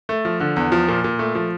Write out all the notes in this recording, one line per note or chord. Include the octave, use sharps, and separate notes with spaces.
A3
F3
D3
E2
F3
A#2
A#2
A3
F3